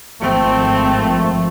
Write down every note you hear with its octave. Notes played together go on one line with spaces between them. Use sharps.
G#1 F3 A3 C4